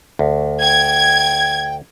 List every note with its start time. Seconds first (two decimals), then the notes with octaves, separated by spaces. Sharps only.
0.19 D2
0.61 G5 G#6